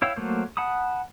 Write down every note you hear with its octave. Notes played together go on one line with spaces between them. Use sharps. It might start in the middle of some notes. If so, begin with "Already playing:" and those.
E4 C#5 F5 G5 E6
F#3 A3 A#3 C5
F#5 A5 B5 D#6